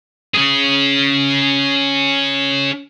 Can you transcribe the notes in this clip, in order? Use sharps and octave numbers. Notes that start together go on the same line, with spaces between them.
C#4 G#4